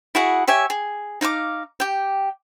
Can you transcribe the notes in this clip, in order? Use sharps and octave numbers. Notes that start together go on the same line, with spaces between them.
E4 F#4 G#4 F#5
G4 C#5 E5 G#5
G#4
D#4 F5 G5 D6
G4 G5